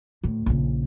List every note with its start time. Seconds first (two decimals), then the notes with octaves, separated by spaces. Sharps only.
0.24 D2 A2
0.46 A#1 C#3